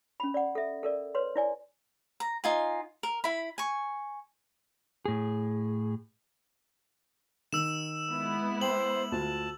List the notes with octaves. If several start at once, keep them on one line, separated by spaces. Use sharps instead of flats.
C#4 B5
D5 F#5
A4 E5
A4 A#4 D5
B4 C#5 C6
E4 D5 G#5
A#5
D#4 F4 G#5
A#4
E4 B5
G#5 C#6
A2 G#4
D#3 E6 E7
G#3 B3 E4
C5 G5 F#7
D2 F4 A5